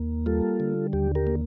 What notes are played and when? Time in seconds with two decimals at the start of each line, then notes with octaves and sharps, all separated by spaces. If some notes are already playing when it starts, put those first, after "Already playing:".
Already playing: D#2 A#3
0.26 G3 F4 A4
0.60 D3
0.93 D#2 G4
1.15 G4 A#4
1.27 A#3